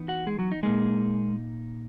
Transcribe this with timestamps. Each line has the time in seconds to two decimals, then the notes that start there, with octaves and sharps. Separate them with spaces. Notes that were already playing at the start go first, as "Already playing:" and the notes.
Already playing: E3 B3 D#4
0.08 F#4 F#5
0.27 G#3 G#4
0.39 F#3 F#4
0.52 D#4
0.63 A#2 G#3 A#3 D#4 G#4